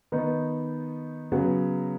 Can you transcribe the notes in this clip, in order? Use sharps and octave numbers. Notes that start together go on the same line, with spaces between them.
D#3 B3 D#4
C#3 F#3 B3 F#4